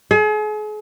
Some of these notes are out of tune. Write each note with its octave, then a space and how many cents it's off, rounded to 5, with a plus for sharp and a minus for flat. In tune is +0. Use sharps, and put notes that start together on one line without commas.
G#4 +40